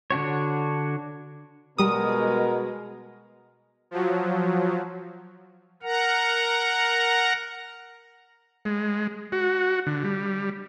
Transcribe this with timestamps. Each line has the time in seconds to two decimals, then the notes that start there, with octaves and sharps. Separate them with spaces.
0.11 D3 D4 F#4 C#5
1.78 B2 G3 G#3 A#4 D#6
3.91 F3 F#3
5.83 A#4 F#5 A#5
8.65 G#3
9.32 F#4
9.87 D3
10.04 G3